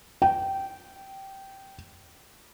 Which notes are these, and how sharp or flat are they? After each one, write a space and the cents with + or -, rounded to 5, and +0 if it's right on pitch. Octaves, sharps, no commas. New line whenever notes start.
G5 -15